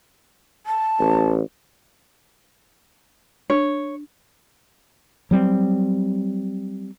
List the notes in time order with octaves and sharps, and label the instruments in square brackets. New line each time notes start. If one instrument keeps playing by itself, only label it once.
[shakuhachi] A5
[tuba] A1
[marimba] D4 [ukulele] C#5
[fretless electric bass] F#3 G3 C4